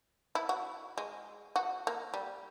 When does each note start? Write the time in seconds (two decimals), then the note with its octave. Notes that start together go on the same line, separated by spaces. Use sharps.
0.35 E4
0.49 F#4
0.98 G#3
1.56 F#4
1.87 A#3
2.14 G3